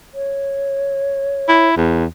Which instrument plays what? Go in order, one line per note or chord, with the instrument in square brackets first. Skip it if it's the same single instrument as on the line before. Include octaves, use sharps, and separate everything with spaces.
[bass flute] C#5
[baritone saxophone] E4
E2